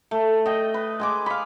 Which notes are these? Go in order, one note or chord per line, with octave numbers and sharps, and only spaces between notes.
A3
D#5 G5
B4
G#3 G#4 D6
F5 B5